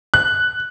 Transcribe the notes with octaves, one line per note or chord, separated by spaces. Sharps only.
F#6